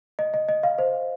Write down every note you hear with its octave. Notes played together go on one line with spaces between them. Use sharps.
D#5
D#5
D#5
F5
C5